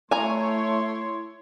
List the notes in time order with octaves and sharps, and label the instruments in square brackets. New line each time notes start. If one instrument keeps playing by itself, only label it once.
[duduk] A3 [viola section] E4 C#5 [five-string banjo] G#5 A#5 [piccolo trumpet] C6